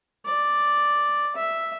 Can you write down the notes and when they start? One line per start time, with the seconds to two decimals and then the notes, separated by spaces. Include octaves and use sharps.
0.25 D5
1.36 E5